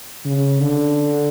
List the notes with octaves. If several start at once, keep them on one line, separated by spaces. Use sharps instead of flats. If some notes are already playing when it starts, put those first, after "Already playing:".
C#3
D3